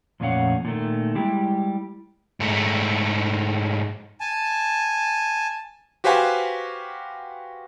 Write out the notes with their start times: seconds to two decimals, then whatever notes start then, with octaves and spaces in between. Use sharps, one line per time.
0.20 F2 A#2 A3 C#4 F5 F#5
0.65 A#2 D#3 A3
1.15 G3 G#3 E4 G4
2.40 G#2 A3
4.20 G#5 A5
6.04 F#4 G4 B4 C5 F5 G#5